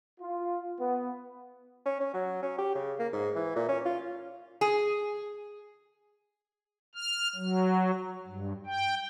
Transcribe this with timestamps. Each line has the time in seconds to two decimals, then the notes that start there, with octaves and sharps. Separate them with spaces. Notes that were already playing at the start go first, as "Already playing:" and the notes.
0.20 F4
0.79 B3
1.86 C#4
2.00 C#4
2.14 F#3
2.42 C#4
2.58 G4
2.75 C#3
2.99 A#3
3.12 G#2
3.35 E3
3.56 A#2
3.68 C#4
3.85 F4
4.61 G#4
6.95 F6
7.35 F#3
8.27 G2
8.66 G5